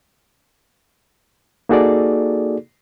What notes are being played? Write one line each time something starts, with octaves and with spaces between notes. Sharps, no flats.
A#3 D#4 F#4 G#4 A4 D5